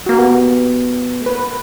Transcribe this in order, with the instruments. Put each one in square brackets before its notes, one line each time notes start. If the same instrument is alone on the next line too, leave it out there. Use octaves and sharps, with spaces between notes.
[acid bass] A#3 [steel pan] F#4
[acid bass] B3 [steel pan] G4
[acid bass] A3
[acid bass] A#3 [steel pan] B4